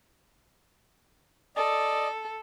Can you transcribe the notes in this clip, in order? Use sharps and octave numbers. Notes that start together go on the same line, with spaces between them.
A4 D5 D#5